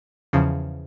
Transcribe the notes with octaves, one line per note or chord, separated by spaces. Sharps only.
E2 C#3 F3